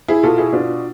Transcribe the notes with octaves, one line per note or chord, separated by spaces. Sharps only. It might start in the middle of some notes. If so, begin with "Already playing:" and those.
E4 G#4
B2 F4 A4
E4 G#4
B2 D4 F4